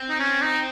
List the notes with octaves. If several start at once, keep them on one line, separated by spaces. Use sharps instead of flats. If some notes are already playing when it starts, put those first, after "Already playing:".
Already playing: C4
D#4
C#4
D#4